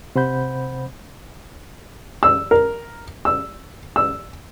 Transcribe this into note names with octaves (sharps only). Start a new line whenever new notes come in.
C3 C5 F#5 B5 G6
E6
A#4
E6
E6